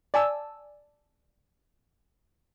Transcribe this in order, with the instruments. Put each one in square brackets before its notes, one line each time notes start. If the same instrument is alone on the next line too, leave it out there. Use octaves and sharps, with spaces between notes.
[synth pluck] D5 G#5 A5 E6